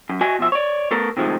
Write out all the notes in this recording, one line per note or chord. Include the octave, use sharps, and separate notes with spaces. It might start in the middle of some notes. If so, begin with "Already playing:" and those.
F#2
F#4 D#5 E5 G#5
B2 F3 E5
C#5 D5
A3 B3 A4 A#4
C3 D#3 F3 G#3 A3